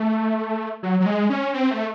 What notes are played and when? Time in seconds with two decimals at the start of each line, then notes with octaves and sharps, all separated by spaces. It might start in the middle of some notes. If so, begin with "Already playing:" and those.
Already playing: A3
0.83 F#3
1.00 F#3
1.06 G#3
1.30 C#4
1.54 C4
1.71 A3